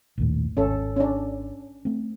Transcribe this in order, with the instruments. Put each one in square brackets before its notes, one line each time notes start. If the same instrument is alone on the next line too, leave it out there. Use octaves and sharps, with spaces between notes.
[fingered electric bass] A#1 D#2 A2
[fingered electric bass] G#1 [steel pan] C#4 A4
[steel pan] C#4 D4
[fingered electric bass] A3 C4